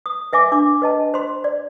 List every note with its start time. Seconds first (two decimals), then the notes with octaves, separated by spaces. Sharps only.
0.06 D#6
0.33 B4 E5 G#5 D6
0.52 D4 D6 E6
0.82 B4 D#5 A5
1.14 C5 B5 C6
1.44 D5